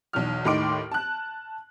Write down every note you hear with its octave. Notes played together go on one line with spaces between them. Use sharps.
B1 E2 F6
D#2 A2 D#4 C6 D6 D7
A5 F#6